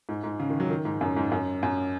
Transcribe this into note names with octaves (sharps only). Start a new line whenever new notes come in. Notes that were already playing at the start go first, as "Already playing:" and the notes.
G#2
G#2
C#3
D#3
F#3
D#3
G#2
F#2
G#2
F#2
F#2